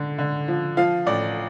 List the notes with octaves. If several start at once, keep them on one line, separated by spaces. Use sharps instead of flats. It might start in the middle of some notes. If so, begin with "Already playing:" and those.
Already playing: D3
D3
F3
F3 F5
A1 D5